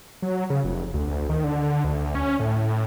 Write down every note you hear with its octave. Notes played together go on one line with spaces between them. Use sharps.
F#3
C#3
F1
D2
D#3
D3
D2
C#4
A2